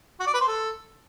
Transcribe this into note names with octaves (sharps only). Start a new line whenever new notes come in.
F#4
D5
B4
C5
A4